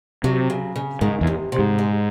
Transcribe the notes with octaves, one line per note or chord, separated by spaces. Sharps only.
C3 F#3
C#3
C#3
G#2 D#3
E2
C3
C3
G#2
G#3